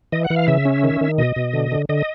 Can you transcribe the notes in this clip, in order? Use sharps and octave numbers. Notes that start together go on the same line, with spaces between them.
E3 D#5
F#5
E3
F5
C#3 E5
C#4
D#3
D#3
B2 D#5
B2
D3
D3
D3 D#5